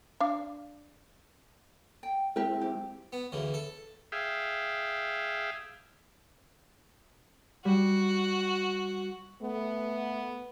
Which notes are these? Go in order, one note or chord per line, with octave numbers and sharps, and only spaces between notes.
D4 F5
G5
G#3 C4 E4 G4 A#4
G4
B3
D2 C#3 E3
A4
G#4 E5 F5 G5
G3 F#4
A3 B3